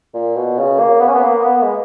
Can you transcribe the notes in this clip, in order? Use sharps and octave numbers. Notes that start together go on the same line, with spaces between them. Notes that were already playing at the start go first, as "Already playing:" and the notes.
A#2
B2
C#3
A#3
B3
C#4
B3
A#3
B3
G#3